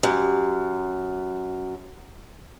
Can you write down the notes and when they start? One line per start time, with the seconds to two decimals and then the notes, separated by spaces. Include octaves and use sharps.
0.03 F#2 G4